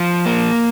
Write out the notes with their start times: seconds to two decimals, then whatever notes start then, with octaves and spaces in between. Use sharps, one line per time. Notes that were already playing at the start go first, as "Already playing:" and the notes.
Already playing: F3
0.26 A#3